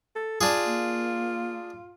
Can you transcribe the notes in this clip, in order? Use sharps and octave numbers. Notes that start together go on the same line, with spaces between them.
A4
D4 F4 G#4
A#3